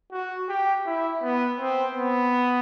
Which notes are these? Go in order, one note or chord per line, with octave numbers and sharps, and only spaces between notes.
F#4
G4
E4
B3
C4
B3